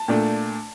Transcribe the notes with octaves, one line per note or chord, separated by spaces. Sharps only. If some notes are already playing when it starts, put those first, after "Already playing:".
Already playing: A5
A#2 A3 D4